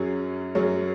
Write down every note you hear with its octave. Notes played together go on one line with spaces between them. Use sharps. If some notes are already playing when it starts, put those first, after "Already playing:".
Already playing: F#2 F#3 C#4 G#4
F#2 F#3 C#4 G#4